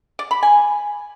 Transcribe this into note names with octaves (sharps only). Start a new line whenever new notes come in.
D5
B5
G#5